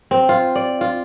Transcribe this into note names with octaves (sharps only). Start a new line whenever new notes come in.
C4
F4
D5
F4